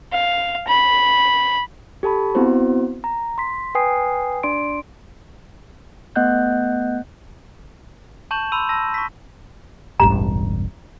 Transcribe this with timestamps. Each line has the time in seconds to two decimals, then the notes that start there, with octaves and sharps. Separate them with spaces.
0.13 F5
0.68 B5
2.03 G4 A4 A5 B5
2.35 B3 C4 E4 F#4 C5
3.04 A#5
3.38 C6 B6
3.75 B4 G5 G#5 D#6 C7
4.43 D4 D5 C6 D7
6.16 A3 B3 D#5 F#5 F#6 G6
8.31 A5 C#6 G6 E7 F#7
8.52 B5 C6 E6 D#7
8.69 A5 E6 A#6
8.94 C#6 B6
10.00 E1 A1 G2 A#5